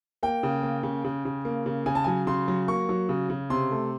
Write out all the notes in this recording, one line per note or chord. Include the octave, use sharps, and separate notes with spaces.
A#3 G5
C#3
A#3
C#3
C#3
C#3
A#3
C#3
C#3 G#5
A5
F#3 G#5
C#3 C6
F#3
A#3 C#6
F#3
C#3
C#3
C3 C6
A3